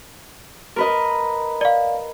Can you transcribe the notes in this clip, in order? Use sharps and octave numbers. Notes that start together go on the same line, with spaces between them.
A#4 B4 D#5
D5 F5